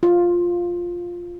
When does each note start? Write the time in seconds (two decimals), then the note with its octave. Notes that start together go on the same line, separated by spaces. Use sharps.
0.03 F4